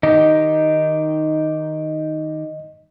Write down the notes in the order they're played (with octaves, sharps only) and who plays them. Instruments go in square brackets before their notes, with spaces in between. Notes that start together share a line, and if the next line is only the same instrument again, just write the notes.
[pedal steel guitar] D#3 D#4 G4 [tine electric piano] D#5